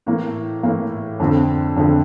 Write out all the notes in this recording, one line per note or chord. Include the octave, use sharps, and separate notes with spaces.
A2 E3 A#3
A2 E3 A#3
F2 D3 F3 C4
F2 D3 F3 C4